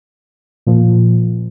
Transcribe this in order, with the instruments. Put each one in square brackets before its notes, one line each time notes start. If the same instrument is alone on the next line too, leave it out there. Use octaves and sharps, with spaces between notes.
[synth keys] A#2 F3